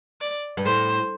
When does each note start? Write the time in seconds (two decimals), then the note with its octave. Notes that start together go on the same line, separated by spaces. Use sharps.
0.21 D5
0.57 G2
0.65 A2 C5